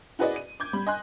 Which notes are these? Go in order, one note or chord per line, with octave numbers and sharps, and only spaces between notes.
E4 F#4 G#4 B4 D5 D#5
D#7
D6 G6 G#6
G3 B5
D#5 G#5 C6 F#6